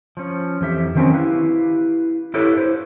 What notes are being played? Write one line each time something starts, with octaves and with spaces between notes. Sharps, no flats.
F3 C#4
F2 E3 G4 E5
D#3 E3 F#3 C4 C#4
E4 G4 B4 F5
E4 G4 A4 B4 C#5 E5
E4 C5